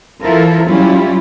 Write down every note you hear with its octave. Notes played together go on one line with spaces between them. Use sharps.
E3 E4 F4 A4 A#4 C5
F#3 G3 C#4 E4 F4 G4